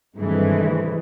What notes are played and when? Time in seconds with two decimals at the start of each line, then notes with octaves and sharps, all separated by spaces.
0.18 G2 C3 D#3 E3 G#3 A3